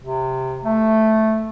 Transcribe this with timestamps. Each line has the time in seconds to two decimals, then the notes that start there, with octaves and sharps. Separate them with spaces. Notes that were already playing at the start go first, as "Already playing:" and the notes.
0.02 C3
0.65 A3